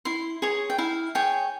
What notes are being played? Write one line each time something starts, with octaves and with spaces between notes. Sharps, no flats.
E4 C6
G#4 C#5
G5
E4 F5
G#4 C#5 G5